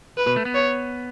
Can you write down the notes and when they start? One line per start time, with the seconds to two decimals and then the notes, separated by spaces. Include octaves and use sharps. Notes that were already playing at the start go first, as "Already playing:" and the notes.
0.18 B4
0.26 B2
0.36 A3
0.45 B3
0.55 C#5